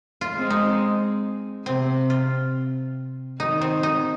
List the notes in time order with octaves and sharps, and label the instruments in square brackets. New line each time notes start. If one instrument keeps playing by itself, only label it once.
[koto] F4
[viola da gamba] G#3 C4
[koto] D#4
[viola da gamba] C3 [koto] C4
[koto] F4
[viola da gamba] D#3 [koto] D#4
[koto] C4
D#4